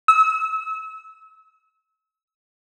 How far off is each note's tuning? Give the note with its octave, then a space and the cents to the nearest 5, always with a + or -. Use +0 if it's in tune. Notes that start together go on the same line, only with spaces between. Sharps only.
E6 -35